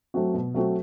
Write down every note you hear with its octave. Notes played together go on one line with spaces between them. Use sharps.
F#3 A3 C4 F#4
B2
F#3 A3 C4 F#4